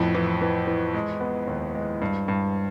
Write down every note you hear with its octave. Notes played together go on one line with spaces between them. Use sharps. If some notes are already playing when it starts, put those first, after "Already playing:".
Already playing: F2 A2 B3
E3
E3
E3
G#3
B3
D#2
G#3
G2
G2